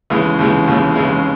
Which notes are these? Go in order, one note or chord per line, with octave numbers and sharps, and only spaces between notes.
D#2 C#3 E3 G#3
D#2 C#3 E3 G#3
D#2 C#3 E3 G#3
D#2 C#3 E3 G#3